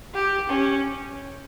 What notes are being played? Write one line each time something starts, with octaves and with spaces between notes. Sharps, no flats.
G4
C#4